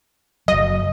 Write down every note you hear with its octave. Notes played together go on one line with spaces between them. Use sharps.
F#1 F#3 D#5